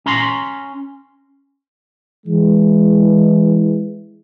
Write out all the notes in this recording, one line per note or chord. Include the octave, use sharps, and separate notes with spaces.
C#4 A#5 C6
E3 G#3